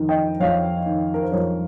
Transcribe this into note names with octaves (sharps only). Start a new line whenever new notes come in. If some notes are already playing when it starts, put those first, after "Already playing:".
Already playing: F2 D#3
D#5 G5
F2 C#5 F5
D#3
A#4
C5
F2 A#4 C#5